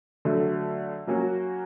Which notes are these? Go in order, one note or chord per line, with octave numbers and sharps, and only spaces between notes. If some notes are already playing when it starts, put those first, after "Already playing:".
D3 F#3 A3
F#3 A#3 C#4 F#4